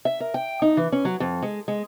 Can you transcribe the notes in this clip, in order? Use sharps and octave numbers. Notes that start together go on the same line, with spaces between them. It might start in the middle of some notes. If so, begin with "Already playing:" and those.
E5
A#4
G5
D#4
E3
C#4
F#3
F2
G#3
G#3